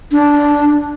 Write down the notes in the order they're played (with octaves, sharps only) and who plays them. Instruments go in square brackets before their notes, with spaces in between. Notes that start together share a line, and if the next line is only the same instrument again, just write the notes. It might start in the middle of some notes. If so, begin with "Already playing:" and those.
[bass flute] D4